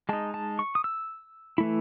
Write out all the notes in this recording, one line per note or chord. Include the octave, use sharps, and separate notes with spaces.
G#3 D#4 A5
A5
C#6
D#6
E6
E3 A3 E4